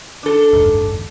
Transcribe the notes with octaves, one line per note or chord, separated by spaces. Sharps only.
D4 A4
F#1 D#2 G#2